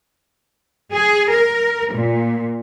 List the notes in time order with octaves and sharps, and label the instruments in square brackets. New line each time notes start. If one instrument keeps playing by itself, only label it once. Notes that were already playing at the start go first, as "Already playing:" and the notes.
[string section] G#4
A#4
A#2